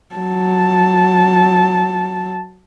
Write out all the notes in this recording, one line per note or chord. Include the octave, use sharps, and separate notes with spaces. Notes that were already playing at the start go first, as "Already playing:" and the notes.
F#3 A5